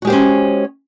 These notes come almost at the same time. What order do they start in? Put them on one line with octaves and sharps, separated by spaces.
F#4 G#3 G4 C5 C#4